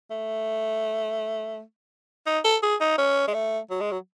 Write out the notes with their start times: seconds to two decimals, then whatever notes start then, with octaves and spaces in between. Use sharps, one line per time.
0.11 A3
2.26 D#4
2.44 A4
2.63 G#4
2.81 D#4
2.98 C#4
3.27 G#3
3.34 A3
3.70 F#3
3.81 G#3
3.91 F#3